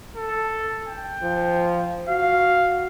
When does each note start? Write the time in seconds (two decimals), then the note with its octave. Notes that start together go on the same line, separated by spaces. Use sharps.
0.15 A4
0.88 G5
1.22 F3
2.09 F#4 F5